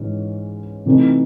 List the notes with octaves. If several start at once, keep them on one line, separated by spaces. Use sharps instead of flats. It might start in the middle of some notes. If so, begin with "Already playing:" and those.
Already playing: G#2 E3 C#4
C3 E3 A3 C4 D#4